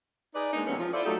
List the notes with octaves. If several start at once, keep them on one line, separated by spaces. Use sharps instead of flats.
D#4 G#4 B4 D5
G#3 A#3 D4 D#4
C3 E3 F#3 A3 B3 C#4
F3 F4
E4 F4 A4 C5 D5
F#3 A3 D#4 G4 A4